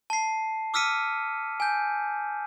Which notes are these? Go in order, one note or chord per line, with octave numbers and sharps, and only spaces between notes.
A5 C7
D6 E6 F6 B6 C#7 D#7
G#5 G6